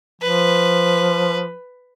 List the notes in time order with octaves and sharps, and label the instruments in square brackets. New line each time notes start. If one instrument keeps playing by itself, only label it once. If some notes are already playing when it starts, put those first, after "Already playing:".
[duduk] F3 [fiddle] B4